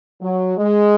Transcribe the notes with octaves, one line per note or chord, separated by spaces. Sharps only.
F#3
G#3